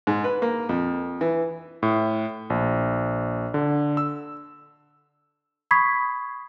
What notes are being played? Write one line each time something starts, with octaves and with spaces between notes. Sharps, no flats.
G#2
B4
A#3
F2
E3
A2
A#1
D3
E6
B5 C#6 D#6 G#6 B6 C7